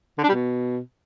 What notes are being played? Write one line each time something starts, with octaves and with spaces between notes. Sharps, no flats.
D3
D4
G3
B2